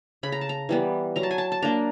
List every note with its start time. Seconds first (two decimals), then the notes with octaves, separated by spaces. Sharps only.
0.23 C#3 B5
0.32 A#5
0.41 A5
0.49 A#5
0.69 E3 G3 B3
1.16 F#3 A#5
1.23 A5
1.31 G#5
1.38 A5
1.52 A5
1.62 A#3 D4 A#5